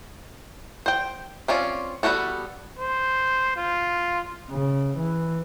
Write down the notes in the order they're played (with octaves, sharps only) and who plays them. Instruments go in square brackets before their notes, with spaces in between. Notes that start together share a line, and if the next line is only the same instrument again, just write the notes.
[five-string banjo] C5 G5
C4 C#4 F4 D5
G3 B3 F4 F#4 A4
[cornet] C5
F4
[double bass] C#3
E3